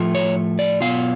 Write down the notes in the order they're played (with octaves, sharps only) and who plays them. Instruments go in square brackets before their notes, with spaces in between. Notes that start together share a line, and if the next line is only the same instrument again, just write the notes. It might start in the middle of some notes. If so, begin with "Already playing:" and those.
Already playing: [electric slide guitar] A2 F3 A3 F4
C#5
D5
B2 F#3 B3 F4 F5